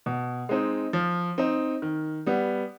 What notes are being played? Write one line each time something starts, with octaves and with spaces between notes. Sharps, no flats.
B2
G#3 C4 D#4
F3
C4 D#4
D#3
G3 B3